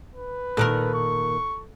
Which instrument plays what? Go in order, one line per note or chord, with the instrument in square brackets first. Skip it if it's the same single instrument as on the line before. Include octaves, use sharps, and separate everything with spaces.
[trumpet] B4
[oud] A#2 D#3 A#4 [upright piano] A4 F#6
[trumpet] C#6